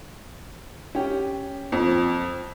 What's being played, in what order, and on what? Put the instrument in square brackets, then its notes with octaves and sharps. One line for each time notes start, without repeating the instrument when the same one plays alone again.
[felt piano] C#4 G4
[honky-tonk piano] F2